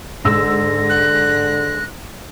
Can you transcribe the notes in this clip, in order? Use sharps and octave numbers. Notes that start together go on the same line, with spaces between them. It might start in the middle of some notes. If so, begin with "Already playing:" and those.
G#2 D3 E6 A#6
F#6